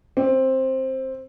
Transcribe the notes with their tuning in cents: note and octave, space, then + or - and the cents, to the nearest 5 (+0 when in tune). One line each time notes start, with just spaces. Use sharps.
C4 +10